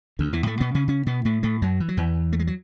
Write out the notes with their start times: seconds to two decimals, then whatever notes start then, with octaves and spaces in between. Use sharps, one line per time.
0.19 D2 D3
0.33 E2 E3
0.46 A2 A3
0.60 B2 B3
0.75 C#3 C#4
0.88 C#3 C#4
1.06 B2 B3
1.25 A2 A3
1.43 A2 A3
1.62 F#2 F#3
1.80 E3
1.88 F#3
1.97 E2 E3
2.33 A3
2.39 G#3
2.47 F#3